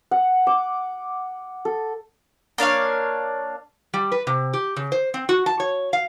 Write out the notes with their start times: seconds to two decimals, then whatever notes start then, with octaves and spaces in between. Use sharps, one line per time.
0.11 F#5
0.47 D6
1.65 A4
2.58 A#3 D4 C#5 F5
3.94 G3
4.12 B4
4.27 C3
4.53 G4
4.76 C#3
4.92 C5
5.14 C4
5.29 F#4
5.46 A5
5.60 C#5
5.93 F5